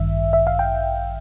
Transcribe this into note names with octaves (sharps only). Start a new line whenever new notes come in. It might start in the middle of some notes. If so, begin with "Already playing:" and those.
Already playing: A1 G2 D#3 E5
E5
F5
G5